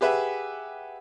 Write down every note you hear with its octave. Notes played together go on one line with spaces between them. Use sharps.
G4 G#4 B4 E5 F#5